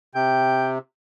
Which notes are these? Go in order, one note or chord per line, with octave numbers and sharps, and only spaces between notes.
C3 G5